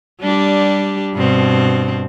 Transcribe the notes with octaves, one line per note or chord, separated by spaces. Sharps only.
G3 D4 G4
G2 B2 C4